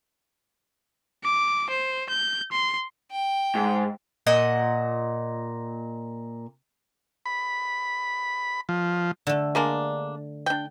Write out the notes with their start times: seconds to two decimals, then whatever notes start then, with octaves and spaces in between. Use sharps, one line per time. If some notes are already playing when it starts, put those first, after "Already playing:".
1.24 D6
1.70 C5
2.09 G6
2.52 C6
3.11 G5
3.55 G#2
4.27 A#2 D#5 F#5
7.26 B5
8.69 F3
9.27 D3 A3
9.55 G#3 A#3 D4
10.46 D4 G5